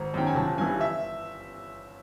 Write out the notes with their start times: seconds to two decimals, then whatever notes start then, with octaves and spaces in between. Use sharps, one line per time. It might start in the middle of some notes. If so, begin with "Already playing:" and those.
Already playing: G#1 A#5
0.14 F#2 D#3 G5
0.27 G#5
0.35 G1 A5
0.58 G2 E3 G#5
0.81 E5